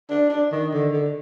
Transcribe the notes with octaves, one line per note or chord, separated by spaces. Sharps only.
D4
D4
D#3
D3
D3